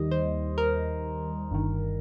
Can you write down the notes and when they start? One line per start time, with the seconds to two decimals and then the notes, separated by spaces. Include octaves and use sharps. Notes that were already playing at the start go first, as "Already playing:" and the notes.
Already playing: D#2 D#3 G3 D#5
0.11 C5
0.58 A#4
1.51 G1 G2 D#3